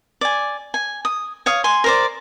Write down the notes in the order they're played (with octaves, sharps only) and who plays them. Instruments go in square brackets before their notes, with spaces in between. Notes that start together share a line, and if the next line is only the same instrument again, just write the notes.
[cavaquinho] D5 G#5
G#5
D#6
C#5 F5 D#6
G#5 C6
A#4 C5 D5